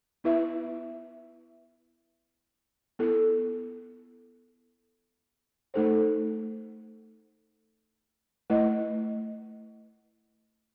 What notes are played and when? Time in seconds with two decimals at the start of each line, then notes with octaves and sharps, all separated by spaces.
0.24 B3 E4 B4 E5
2.99 B3 E4 A4
5.74 A3 D#4 A4 C5
8.50 A3 E4 B4 D#5